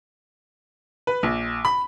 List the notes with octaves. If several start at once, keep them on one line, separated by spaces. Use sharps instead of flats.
B4
A#1
B5